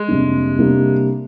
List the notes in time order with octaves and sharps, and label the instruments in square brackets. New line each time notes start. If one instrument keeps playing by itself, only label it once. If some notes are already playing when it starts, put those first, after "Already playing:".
Already playing: [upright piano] G#3
[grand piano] F2 C3 G3 A#3 D4
C3 G3 A#3 D4